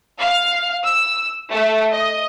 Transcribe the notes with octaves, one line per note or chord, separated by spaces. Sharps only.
F5
E6
A3
D#5